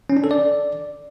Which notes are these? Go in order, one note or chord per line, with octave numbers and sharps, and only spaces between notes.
C#4
D4
A4
D5